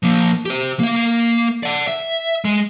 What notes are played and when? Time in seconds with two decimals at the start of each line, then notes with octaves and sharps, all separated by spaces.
0.03 F3 A#3
0.46 G4 C5
0.79 A#3 F5
1.63 D5 F#5
1.87 E5
2.45 G#3